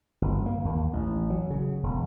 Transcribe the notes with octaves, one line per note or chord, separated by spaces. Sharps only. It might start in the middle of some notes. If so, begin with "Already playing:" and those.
G1
A#3
D#2
A1
F#3
C#3
E1